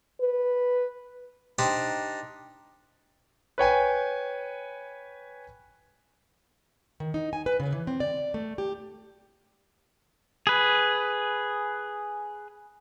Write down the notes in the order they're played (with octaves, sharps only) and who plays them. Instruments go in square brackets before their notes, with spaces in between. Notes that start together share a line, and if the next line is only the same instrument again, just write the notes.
[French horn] B4
[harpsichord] D4 D#4 G4 C5
[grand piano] B4 C#5 G5 G#5
[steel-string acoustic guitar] D#3
D#4
G#5
B4
C#3
E3
C4
D5
A3
G4
[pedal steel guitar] G#4 B4